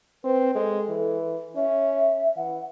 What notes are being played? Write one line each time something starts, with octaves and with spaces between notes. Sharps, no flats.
C4 B4
G#3 A4
E3
C#4 E5
E3 F#5